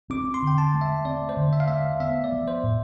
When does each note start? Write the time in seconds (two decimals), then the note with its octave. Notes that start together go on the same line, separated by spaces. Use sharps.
0.10 C4 D6
0.34 C6
0.43 D3 G5
0.58 A5
0.74 A3
0.81 E5
1.05 C4 D5
1.29 C5
1.37 D3
1.53 E5
1.60 F5
1.68 A3 E5
2.00 B3 E5
2.24 D5
2.32 F3
2.48 C5
2.64 A2